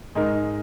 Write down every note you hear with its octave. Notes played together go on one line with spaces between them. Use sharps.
G#2 G#3 D#4 A#4